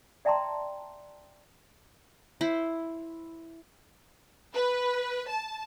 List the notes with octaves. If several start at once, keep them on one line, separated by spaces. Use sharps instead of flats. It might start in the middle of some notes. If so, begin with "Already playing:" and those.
D5 E5 G5 A5 A#5 C6
E4 C5
B4
A5